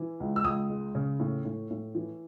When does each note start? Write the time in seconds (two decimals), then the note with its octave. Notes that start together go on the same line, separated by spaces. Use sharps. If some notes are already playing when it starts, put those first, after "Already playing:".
Already playing: E3
0.20 C#2
0.36 E6
0.44 C#2 D#6
0.70 G#3
0.95 C#3
1.20 A2
1.45 A2
1.70 A2
1.95 E3